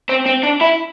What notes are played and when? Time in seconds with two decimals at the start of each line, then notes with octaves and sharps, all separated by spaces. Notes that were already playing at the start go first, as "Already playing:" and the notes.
0.09 C4
0.26 C4
0.43 D4
0.61 E4